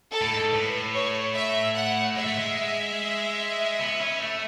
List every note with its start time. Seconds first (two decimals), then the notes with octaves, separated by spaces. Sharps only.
0.10 A4
0.22 A2
0.31 G#2
0.51 A2 B4
0.93 C#5
1.34 E5
1.75 F#5
2.16 G#3 E5
2.27 A3
2.38 G#3
3.79 B3
4.01 C#4
4.21 A3